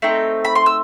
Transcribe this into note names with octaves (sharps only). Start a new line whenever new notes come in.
A3 C4 D#4 G5
B5
C6
E6